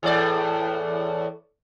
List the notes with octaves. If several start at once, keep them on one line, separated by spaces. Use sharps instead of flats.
E2 A2 D5